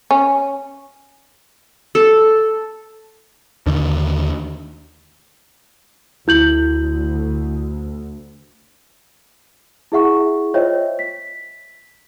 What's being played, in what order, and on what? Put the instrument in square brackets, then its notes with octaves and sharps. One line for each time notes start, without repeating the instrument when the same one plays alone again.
[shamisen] C#4
[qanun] A4
[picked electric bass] D#2 D3
[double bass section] D2 [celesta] E4 G6 F#7
[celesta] E4 G#4 E5 F#5 C#6
F4 C5 C#5 D#5 E5 G5
B6